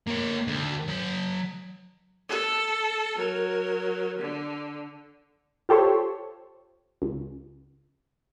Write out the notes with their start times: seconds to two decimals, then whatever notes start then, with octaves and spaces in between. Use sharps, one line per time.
0.07 A#3 C#5
0.47 D2
0.88 F#3 A5
2.29 A4
3.16 F#3 A#4
4.19 D3
5.69 F4 G4 A4 C5 C#5
7.02 C#2